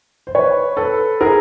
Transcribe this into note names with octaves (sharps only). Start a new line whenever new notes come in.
C5
B4 C#5
A4 B4
G#4 A#4